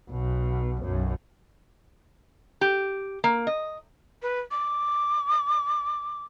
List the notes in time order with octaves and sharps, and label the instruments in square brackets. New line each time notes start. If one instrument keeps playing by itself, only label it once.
[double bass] B1 B2
B1 F#2
[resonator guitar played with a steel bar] G4
A#3
D#5
[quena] B4
D6